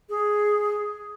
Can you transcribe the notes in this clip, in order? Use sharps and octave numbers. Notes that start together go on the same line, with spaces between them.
G#4